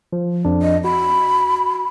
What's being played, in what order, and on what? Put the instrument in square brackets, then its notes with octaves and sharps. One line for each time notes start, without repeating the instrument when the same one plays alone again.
[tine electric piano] F3
F2 D4
[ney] D#5
[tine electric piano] F#4 [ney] B5